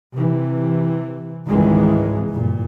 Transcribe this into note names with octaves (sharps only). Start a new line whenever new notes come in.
C3 E3
G#1 C#2 G2 D#3 E3 G#3
F#1 G2 A#2